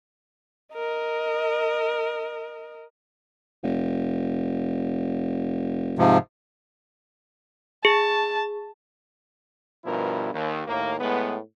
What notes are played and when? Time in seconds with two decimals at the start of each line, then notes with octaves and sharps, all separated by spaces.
0.74 A#4 D#5
3.63 F1
5.98 G#2 C3 F3
7.85 G#4 A5
9.85 G2 B2 F3 E4 A#4
10.32 D#2
10.67 D#2 A2 A#3
11.00 A2 G#3 B3